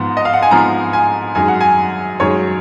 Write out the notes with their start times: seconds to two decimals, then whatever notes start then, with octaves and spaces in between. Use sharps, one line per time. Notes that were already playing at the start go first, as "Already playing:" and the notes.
Already playing: G#2 F3 B3
0.17 D#5
0.25 F5
0.33 F#5
0.42 G#5
0.51 G#2 F3 B3 A#5
0.93 G#5
1.35 F#2 D#3 G#3 G#5
1.48 F#5
1.61 G#5
2.20 F#2 D#3 G#3 C#5